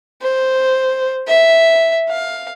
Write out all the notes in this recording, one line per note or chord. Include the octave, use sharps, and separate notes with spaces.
C5
E5
F5